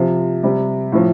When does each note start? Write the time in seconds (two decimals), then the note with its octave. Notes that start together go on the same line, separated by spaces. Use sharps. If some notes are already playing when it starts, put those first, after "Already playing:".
Already playing: C3 F3
0.43 C3 G3
0.92 A2 F3